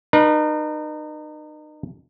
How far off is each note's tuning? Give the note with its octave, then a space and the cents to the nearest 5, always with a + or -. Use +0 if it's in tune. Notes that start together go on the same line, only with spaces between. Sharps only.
D#4 -35 B4 -45